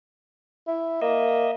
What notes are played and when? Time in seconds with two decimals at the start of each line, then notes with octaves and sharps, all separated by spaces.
0.67 E4
1.02 A#3 D#5 E5